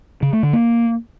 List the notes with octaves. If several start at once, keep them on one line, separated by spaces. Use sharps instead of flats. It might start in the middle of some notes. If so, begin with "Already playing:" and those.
C#3
A3
D3
A#3